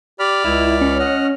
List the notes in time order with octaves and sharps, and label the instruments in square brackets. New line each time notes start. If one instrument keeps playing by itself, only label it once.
[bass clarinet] G4 [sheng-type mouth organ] D5 B5 F6
[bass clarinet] C#2 [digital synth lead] E4
[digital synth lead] C#4
[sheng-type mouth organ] D#5 F#5 F6